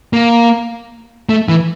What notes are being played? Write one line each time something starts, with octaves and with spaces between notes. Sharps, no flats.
A#3
A3
E3